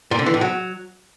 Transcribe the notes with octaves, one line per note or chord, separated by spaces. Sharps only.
A#2
D3
E3
A2
F#3